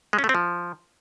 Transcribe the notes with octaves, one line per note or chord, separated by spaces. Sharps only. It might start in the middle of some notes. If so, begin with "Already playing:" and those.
G#3
C#4
A3
C4
F3